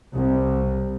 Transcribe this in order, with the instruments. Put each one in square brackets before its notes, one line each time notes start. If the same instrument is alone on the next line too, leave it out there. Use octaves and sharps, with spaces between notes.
[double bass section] C2